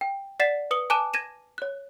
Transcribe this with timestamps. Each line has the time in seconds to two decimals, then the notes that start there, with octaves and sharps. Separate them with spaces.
0.01 G5
0.40 D5 F#5 A6 B6 C7 E7
0.71 B4 D#6 C#7 F#7 G7
0.90 G#5 A5 D6 F#6 D#7 E7
1.14 G#6 A#6 D#7 E7
1.58 C#5 F#6